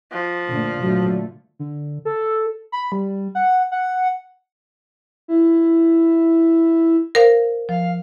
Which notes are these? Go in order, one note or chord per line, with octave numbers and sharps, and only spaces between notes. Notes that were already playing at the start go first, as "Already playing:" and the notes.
F3
A#2 D3 A3
A#2 D3 F#3 A3
D3
A4
B5
G3
F#5
F#5
E4
A#4 C5 F5
F3 F5